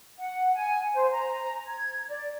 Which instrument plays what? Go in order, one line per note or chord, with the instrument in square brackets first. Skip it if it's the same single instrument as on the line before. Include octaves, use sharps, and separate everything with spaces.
[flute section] F#5
G#5
C5
A#5
G#6
D5